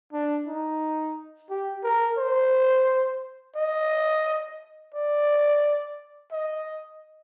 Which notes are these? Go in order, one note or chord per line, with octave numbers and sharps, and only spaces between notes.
D4
D#4
G4
A#4
C5
D#5
D5
D#5